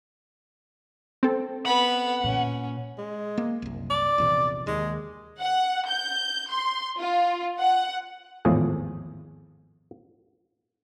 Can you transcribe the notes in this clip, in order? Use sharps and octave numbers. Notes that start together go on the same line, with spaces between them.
C4 A4
B3 F#5 B5
A#2 C#4
G#3
A#3
F#1 C2
D5
A#1 E2 C3
D#2 G#3
F#5
G6
C6
F4
F#5
G#1 E2 A2 F3 G#4